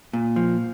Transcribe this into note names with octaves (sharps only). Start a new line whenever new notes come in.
A#2
F3